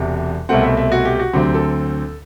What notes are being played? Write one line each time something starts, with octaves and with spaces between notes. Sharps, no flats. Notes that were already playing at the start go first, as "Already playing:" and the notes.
Already playing: E1 E2 C3
C2 B2 A3 C4 F#5
E5
E5
F#4
G4
F#4
D2 D3 F#3 C4 G4
A4